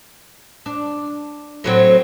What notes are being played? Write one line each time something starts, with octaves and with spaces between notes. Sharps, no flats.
D4
A2 F#3 C4